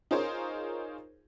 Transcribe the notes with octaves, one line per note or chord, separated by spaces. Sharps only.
D#4 F4 G#4 A#4 C5 C#5